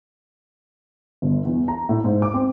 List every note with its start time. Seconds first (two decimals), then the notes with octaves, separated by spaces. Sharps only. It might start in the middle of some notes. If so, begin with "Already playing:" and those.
1.22 G1
1.45 E2
1.68 A#5
1.89 A2
2.04 G#2
2.22 D6
2.34 C4